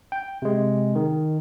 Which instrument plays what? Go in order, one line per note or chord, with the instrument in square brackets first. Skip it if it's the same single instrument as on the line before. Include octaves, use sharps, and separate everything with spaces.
[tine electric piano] G5
C3 G#3
D#3